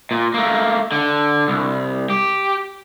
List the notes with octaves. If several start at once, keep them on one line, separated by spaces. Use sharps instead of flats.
A#2
A3 A#3
D3
C2
G4